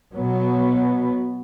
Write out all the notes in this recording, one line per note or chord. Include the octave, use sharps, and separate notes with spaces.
B2 F#3 B3